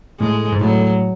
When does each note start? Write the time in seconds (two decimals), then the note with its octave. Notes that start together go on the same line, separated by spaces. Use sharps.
0.20 A2 G#3
0.52 G#2
0.60 A2 F#3